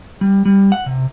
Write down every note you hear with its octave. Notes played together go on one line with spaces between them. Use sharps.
G3
G3
F#5
C3